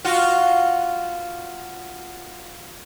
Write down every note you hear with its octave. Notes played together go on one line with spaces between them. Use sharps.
F4 F#4